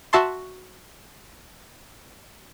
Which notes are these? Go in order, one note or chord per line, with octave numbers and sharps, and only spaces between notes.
F#4 E5 A5 C6